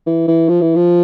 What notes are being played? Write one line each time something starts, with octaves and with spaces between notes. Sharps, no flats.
E3
E3
F3
E3
F3